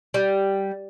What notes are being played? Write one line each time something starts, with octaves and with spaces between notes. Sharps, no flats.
G3